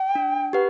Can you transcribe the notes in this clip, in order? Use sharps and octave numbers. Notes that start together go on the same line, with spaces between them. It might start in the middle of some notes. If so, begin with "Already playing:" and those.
Already playing: G5
D4
G4 B4 F#5